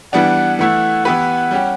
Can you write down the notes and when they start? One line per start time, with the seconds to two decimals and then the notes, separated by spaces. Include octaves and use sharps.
0.13 E3 G3 B3 D4 F#5
0.59 E3 A3 E4 F#5
1.05 E3 B3 E4 G4 B4 F#5
1.51 G3 C#4 G4